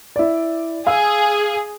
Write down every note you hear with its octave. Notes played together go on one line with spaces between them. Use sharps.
E4 D5
G#4 F5 G#5 E6